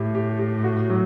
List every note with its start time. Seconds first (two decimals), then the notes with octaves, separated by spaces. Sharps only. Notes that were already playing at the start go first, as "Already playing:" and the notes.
Already playing: A2 E4 G4
0.15 G4
0.39 G4
0.64 F#4
0.90 F#3